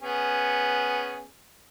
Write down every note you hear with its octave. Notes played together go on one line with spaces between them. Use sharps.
B3 C#4 G#4